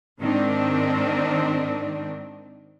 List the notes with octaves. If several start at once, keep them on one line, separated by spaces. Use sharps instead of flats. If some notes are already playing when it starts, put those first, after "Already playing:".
G#2 D#3 C4 D4